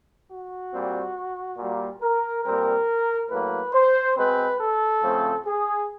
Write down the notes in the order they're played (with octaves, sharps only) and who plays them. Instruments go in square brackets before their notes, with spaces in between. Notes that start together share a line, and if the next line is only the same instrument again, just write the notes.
[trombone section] F#4
A#2 G3 C4
A#2 G3 A#3
A#4
A#2 G3 C4 A#4
A2 F#3 A#3 B4
C5
B2 G#3 C4 B4
A4
C#3 F3 A3 C4
G#4